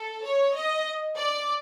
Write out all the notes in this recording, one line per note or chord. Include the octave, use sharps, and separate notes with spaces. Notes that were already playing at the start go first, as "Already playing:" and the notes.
Already playing: A4
C#5
D#5
D5